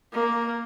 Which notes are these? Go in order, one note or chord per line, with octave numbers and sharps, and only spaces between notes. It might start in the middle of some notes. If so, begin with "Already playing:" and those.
A#3